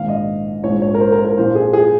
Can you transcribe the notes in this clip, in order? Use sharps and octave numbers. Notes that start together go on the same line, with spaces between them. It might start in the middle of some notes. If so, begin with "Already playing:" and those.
Already playing: A#1 G#2 D#3 F5
D#5
A#1 G#2 F3 C#5
C#5
A#4
C5
A#4
A#4
A#1 A#2 F3 C5
G#4
G#4